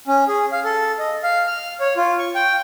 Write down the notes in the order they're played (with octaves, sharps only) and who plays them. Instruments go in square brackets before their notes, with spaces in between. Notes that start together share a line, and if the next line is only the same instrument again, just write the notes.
[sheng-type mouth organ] C#4
G#4
F5
A4
D#5
F5
F6
C#5
F4
C#6
G5